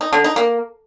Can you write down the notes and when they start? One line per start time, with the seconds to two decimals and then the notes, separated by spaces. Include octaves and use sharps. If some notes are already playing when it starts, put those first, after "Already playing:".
0.01 D#4
0.13 D3
0.24 D#4
0.36 A#3